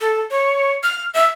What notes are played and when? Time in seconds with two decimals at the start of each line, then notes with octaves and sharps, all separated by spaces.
0.01 A4
0.30 C#5
0.83 F6
1.14 E5